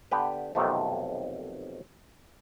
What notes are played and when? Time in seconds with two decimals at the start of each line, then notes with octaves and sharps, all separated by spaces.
0.11 D3 B3 G4 B4
0.55 B1 F2 C3 D#3 A3